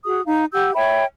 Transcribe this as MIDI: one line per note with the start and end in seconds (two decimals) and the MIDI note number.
0.04 0.21 66
0.04 0.21 68
0.04 0.21 87
0.25 0.43 63
0.25 0.43 77
0.52 0.70 67
0.52 0.70 78
0.52 0.70 88
0.52 0.70 91
0.74 1.04 73
0.74 1.04 76
0.74 1.04 79
0.74 1.04 83